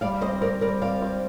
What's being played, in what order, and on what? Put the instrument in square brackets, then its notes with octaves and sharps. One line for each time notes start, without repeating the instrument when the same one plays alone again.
[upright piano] G3 [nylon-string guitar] D5 F5
[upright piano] C4 [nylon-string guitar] C5 D#5
[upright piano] C4 [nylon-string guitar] A#4 D5
[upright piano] G3 [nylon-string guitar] A#4 D5
[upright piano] C4 [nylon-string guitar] D5 F5
[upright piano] C4